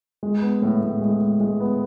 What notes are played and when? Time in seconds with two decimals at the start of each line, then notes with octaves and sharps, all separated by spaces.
0.23 G#3
0.42 B3
0.62 A2
0.81 A2
1.01 G#3
1.21 G#3
1.40 G#3
1.60 B3